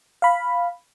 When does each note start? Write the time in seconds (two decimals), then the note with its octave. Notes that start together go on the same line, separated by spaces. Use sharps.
0.22 F5 B5